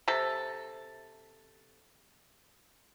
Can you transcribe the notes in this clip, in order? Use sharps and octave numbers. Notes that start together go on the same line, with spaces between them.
C3 A4